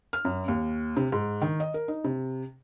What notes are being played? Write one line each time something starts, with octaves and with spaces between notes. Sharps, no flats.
F6
F#2
D#2
C3
G#2
D#3
D#5
A#4
D#4
C3